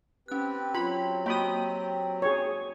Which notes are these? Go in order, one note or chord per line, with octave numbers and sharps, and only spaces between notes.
C4 C#4 G4 B4 F#6
F#3 C4 F4 G4 B5 C6
A#3 F#4 G5 B5 D#6
G#4 C#5